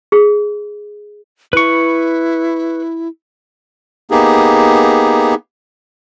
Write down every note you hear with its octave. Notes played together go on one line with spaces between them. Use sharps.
G#4
E4 B4 C#6
A#3 B3 D#4 G4 G#4